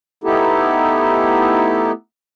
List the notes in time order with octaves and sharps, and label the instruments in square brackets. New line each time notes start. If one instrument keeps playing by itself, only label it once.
[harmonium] A3 B3 D#4 E4 G4 A4